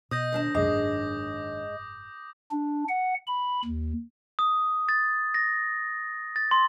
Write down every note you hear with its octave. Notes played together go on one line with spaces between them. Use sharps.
B2 D#5 D#6 G6 A#6
D#2 D4 A5
C2 F#2 A#2 G#3 D6 A#6
F#1 G#2
D4
F#5
B5
D#2
D#6
A6
A#6
A6
C6